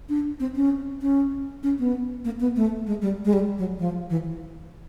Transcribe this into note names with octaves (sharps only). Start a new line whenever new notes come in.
D4
C4
C#4
C#4
C#4
B3
A#3
B3
A3
G#3
G3
G#3
G3
F#3
F3
E3